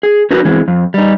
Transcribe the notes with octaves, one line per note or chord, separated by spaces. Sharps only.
G#4
C#4 D#4 F#4 G4 A#4 B4
E3 G#3 C4
F2
G3 D#4